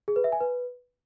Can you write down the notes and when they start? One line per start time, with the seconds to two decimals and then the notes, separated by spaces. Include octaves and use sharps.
0.08 G#4
0.16 B4
0.24 E5
0.32 G#5
0.41 B4